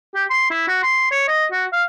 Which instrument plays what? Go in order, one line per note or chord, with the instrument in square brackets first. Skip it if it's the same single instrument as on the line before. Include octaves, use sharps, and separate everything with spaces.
[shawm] G4
C6
E4
F#4
C6
C#5
D#5
F#4
F5